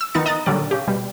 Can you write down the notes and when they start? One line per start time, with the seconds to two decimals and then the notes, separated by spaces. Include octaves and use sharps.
0.01 E6
0.14 D#3 B3 D#4 A6 C#7
0.26 D#5 A#5 D#6 F#6 A6
0.46 A#2 D3 D#3 F#3 G3 D5
0.71 C#3 G4
0.88 B2 G3